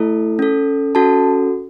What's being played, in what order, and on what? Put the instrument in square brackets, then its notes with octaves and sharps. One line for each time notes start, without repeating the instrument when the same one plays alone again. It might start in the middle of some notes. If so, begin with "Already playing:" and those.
Already playing: [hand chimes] A3 E4 A4
C#4 A4
C#4 F#4 A4 A5